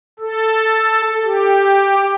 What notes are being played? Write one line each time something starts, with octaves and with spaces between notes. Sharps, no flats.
A4
G4